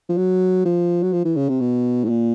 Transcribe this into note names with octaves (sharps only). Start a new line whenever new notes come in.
F3
F#3
F3
F#3
F3
E3
C#3
C3
B2
A2
A#2